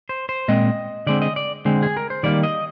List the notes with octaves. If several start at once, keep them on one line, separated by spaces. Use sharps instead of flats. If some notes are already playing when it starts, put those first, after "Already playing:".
C5
C5
A#2 G#3 C4 D#5
D3 G#3 C4 D5
D#5
D5
D3 G#3 C4
G#4
A#4
C5
D#3 G3 A#3 D5
D#5